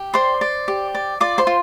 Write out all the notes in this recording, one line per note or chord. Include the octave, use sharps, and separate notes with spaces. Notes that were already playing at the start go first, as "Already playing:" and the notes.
Already playing: G4
C5 D5 C6
D5
G4
D5
F4 D5 D6
C5 C6
F4